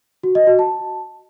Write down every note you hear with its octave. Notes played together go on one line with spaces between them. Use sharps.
F#4
D#5
F#4
A5